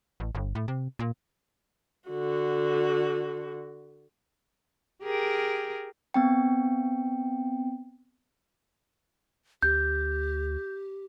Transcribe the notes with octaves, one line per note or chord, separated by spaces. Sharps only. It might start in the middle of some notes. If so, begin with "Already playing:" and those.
A1
G1
A2
C3
A#2
D3 F#4
G4 G#4 A#4
B3 C4 G5
D2 G4 G6